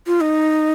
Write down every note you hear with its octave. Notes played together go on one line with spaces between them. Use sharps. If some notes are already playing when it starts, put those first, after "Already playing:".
F4
D#4